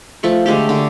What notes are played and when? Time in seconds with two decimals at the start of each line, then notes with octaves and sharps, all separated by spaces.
0.23 F3 A3 C#6
0.46 D3 G#3 A3 G4
0.69 D3